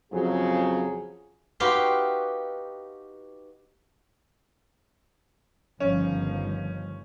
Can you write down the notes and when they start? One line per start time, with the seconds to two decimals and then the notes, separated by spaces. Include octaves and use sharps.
0.12 F2 C#3 F#3 G#4
1.60 D#4 F#4 G4 B4 F5 C6
5.80 G1 D#3 F3 C#4